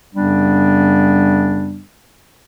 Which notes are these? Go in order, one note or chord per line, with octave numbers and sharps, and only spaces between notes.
F#2 C#3 G3 B3 D4